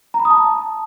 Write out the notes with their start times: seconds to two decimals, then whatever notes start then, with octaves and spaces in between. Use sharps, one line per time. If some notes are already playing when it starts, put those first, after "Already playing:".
0.14 A#5
0.20 B5
0.25 D#6
0.31 A5